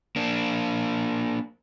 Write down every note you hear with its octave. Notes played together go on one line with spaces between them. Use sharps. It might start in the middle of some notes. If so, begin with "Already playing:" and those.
A#3 D4